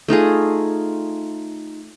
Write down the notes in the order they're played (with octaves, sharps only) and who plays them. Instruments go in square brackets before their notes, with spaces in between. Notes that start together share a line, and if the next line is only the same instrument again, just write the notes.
[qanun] A3 D#4 F4 G#4